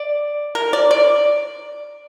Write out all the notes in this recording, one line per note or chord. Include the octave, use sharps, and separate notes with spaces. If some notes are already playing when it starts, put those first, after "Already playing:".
Already playing: D5
A#4
D5
D5